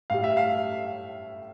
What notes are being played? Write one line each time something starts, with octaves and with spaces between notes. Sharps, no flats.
A2 G3 F5
E5
F5